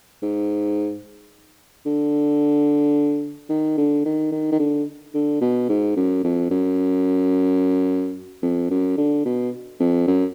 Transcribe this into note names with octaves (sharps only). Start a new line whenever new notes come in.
G#2
D3
D#3
D3
D#3
D#3
D#3
D3
D3
B2
G#2
F#2
F2
F#2
F2
F#2
D3
B2
F2
F#2